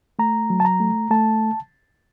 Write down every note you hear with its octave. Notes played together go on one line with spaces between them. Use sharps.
A3 A#5
F#3
A5
A#5
A3
A3 A5